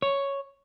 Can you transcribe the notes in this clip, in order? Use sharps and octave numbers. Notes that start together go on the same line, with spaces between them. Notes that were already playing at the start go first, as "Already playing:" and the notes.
C#5